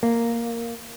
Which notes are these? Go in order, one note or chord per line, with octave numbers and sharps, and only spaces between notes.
A#3